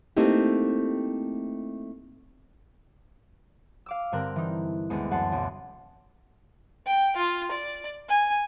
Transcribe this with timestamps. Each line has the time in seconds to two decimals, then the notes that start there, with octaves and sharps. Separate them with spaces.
0.17 A3 A#3 C4 D#4 E4 G4
3.86 F5 D6 E6
4.12 G2 D3 C4 A#4 F#6
4.36 E3 D#4
4.90 D2 G#3 B3 C4
5.11 F#2 F#5 A5 C6
5.32 B1
6.86 G5
7.16 F4
7.51 D5
8.09 G#5